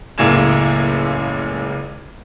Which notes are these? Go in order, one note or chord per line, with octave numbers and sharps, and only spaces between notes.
F#1 C#2 A2 A#3 G#6 E7